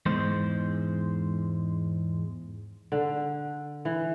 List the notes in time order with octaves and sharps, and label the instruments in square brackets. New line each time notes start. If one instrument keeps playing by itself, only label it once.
[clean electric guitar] E2 G#2 G#3 C5
[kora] D3
E3